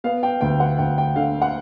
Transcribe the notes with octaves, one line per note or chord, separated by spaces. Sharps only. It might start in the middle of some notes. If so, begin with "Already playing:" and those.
B3 F5
G5
D2 G5
F#5
D2 G5
G5
D3 F5
F#5